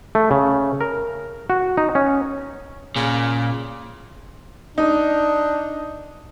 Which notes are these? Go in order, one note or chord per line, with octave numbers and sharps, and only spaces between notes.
A3
C#3
A#4
F#4
D#4
C#4
A#2 C#3
D4 D#4